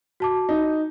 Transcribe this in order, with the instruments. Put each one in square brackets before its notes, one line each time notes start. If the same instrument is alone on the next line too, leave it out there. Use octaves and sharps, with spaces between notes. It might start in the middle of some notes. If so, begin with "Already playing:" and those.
[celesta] F#4 A5 D6
[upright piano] D#4